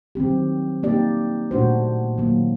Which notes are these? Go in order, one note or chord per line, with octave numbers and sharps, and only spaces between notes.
D#3 F#3 C4 G4
A#3 D#4 G4 D5
A#2 A3 D4 F#4 C5
D#3 F#3 A#3